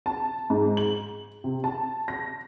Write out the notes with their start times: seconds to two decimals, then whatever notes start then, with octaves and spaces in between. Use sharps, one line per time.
0.06 A5
0.50 G#2
0.77 F#7
1.44 C3
1.64 A5
2.08 A#6